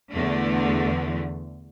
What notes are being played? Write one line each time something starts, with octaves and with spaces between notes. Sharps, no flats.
E2 D3 A3